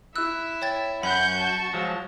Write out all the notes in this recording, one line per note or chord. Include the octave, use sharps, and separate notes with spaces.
E4 E5 E6 F#6
C#5 G5 A6
F#2 C#4 F#5 B5 C#6 F#6 G6
F#4 A5
F3 F#3 G#3